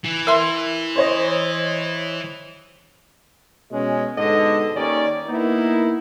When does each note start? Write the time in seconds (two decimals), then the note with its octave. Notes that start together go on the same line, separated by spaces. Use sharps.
0.04 E3
0.27 A#4 E5 C6
0.96 C5 C#5 D#5
3.71 B2 G#3 C#4
4.18 G#2 B2 D3 A4 D#5
4.75 D#2 D#3 C#4 D5
5.27 A#3 B3 D#4 E4 A#4